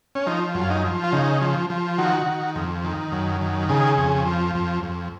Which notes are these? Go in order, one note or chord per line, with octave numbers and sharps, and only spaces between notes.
C#4
F3 D#4
F#2
F4
D#4
F3
F4
C#3 D#4
F3
F3
D#3 F#4
D#3
F2
D#3
F#2
D#3
C#3 G#4
F2
F3
F2
F2